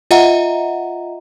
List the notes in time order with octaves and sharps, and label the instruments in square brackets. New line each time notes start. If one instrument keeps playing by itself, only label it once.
[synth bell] F4 D#5 E5 F#5 A#5